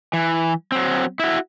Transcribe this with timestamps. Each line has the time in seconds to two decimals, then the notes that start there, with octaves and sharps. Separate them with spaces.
0.13 E3
0.72 F#3 C4
1.19 E4 F#4